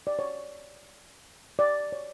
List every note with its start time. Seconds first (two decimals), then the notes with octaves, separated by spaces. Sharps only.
0.07 D5
0.19 C#5
1.59 D5
1.92 C#5